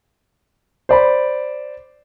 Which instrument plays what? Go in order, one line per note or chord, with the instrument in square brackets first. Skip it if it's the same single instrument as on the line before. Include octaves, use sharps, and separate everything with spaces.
[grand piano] C5 D5 B5